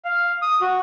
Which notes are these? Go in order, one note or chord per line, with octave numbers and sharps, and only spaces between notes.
F5
D#6
F#4